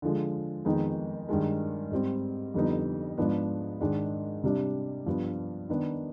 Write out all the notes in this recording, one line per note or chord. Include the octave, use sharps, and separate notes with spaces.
D3 F3 G#3
F2 D#3 G#3 B3 D#4
G2 D#3 G#3
G#2 G3 C4
F2 D3 G3 B3 D#4
G#2 F3 B3 D4
G#2 D#3 G#3 D4
C3 G3 D4
G2 F3 B3
D#3 B3 D4